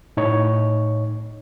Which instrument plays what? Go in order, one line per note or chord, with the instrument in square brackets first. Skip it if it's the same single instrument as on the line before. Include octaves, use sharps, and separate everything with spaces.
[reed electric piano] A2 D#4 C#5